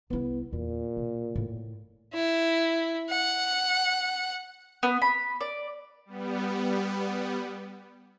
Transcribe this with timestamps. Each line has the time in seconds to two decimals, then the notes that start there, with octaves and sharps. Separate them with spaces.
0.10 C2 B3 E4
0.53 E2 A#2
0.97 B2
1.36 A2
2.14 E4
3.10 F#5
4.83 B3
5.02 B5
5.41 D5
6.06 G3 B3